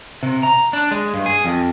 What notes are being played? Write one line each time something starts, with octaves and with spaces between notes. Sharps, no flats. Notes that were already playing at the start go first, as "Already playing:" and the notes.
C3
A#5
D4
G#3
G2
G#4
F2